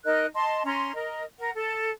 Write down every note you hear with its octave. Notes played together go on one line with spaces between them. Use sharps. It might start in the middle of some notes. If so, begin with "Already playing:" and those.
D#4 A#4 D#5 F#6
D#5 A5 C6
C#4 A#5 C6
A#4 D#5
A#4 F#5
A4